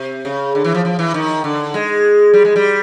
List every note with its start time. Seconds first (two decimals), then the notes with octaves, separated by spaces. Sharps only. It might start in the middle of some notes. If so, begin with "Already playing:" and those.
Already playing: C3
0.25 C#3
0.55 D3
0.64 E3
0.74 F3
0.85 F3
0.99 E3
1.14 D#3
1.44 D3
1.74 G#3
2.34 G3
2.45 G#3
2.56 G3